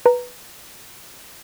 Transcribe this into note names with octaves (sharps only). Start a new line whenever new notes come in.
B4 A#5